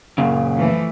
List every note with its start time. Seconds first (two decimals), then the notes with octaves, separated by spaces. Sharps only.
0.18 F#2 A#2 C#3
0.56 E3 F3 A3